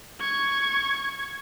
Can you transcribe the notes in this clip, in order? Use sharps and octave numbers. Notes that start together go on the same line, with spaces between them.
C#6 G#6